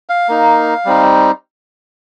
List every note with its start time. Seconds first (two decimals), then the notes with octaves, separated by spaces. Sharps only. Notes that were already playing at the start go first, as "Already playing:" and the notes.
0.09 F5
0.29 A#3 D#4
0.85 G3 C4 D#4